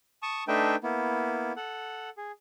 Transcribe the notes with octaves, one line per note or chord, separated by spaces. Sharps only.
A5 C#6 D#6
A3 D4 D#4 B4 E5 G5
A#3 B3 E4
A4 F#5
G#4